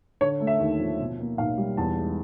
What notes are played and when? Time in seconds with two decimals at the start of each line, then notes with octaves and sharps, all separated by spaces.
0.21 D3 C#5
0.40 A3
0.47 E5
0.60 D#2
0.79 F3
0.99 B2
1.19 A#3
1.38 B1 F5
1.58 G3
1.77 E2 A5
1.97 G#3